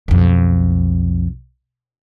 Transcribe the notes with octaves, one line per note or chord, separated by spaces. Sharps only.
B1 F2